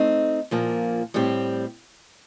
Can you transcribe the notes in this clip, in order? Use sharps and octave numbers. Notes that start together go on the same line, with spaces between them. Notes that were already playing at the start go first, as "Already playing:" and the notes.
Already playing: A3 C4 D#4
A#2 F3 A#3 D4
A2 G3 C4 G4